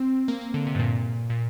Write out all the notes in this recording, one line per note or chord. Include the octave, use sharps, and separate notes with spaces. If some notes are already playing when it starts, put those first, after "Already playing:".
Already playing: C4
A#3
A#3
D3
C3
G2
A#2
A#2